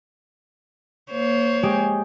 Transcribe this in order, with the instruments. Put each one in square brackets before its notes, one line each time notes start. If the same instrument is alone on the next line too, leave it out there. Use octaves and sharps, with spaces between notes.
[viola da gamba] A#3 C5 C#5
[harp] G#3 G4